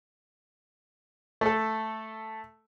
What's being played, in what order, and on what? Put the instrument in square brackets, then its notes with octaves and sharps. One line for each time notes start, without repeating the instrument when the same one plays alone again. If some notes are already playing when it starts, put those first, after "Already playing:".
[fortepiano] A3 A4